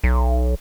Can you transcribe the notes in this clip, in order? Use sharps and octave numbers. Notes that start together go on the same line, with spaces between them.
B1